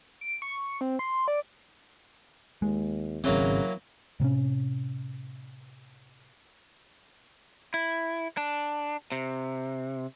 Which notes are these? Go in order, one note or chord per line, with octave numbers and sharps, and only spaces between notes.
D7
C#6
C4
C6
D5
D#2 G#3
G#1 C#3 E3 F#3 A#3 C4
A2 C3 C4 C#4
E4
D4
C3